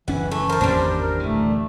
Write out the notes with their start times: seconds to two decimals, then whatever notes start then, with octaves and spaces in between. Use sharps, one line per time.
0.08 F#1 E3 C#4 F#5
0.31 E3 A3
0.49 A#4 C5 A5
0.61 G#1 E2 G3 A#3 D4 C5
0.99 A#4
1.20 D1 E3 A3